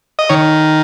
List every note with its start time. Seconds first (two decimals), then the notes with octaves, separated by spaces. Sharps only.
0.19 D#5
0.29 D#3 C#5